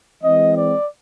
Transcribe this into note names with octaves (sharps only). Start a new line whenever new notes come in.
E3 G#3 C4 D#5
D5